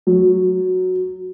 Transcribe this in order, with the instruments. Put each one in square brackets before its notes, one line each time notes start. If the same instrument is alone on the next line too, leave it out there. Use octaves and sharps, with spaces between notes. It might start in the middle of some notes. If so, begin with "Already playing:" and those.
[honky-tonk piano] F#3